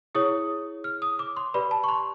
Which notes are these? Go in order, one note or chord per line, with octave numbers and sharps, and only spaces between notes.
E4 G#4 C#5 D#6
F6
D#6
D6
C6
G4 B4 D5 B5
A5
C#6
C6